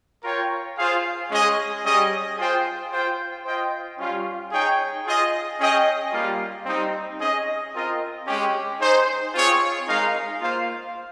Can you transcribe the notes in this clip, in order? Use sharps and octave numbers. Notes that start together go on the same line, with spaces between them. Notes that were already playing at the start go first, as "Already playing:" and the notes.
F4 A#4 C#5 G5
F4 G#4 C5 F5
G#3 C#4 G#4 D#5
G3 C#4 G#4 D#5
F4 G#4 C5 G5
F4 C5 G5
F4 C5 D#5 G5
G3 C#4 F4
D#4 G#4 C#5 G5
F4 G#4 D#5
C#4 G#4 D#5 G5
G3 A#3 F4
G3 C4 D#4
C#4 G#4 D#5
C4 F4 A#4 D#5
G#3 C#4 G4
D#4 G#4 C5
C4 F4 G#4 C#5 F5
G#3 D#4 A#4 F5
A#3 F4 C5 F5